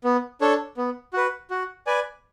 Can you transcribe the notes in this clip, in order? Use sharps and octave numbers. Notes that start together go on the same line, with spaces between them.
B3
D4 A4 C#5
B3
F#4 B4
F#4
B4 D5 G#5